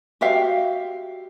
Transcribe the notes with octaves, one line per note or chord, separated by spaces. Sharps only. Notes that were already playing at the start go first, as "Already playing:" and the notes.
F#4 G4 E5 F5